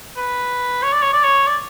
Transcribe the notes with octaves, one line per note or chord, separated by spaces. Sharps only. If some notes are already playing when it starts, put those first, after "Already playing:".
B4
C#5
D5
C#5
D5
C#5
D5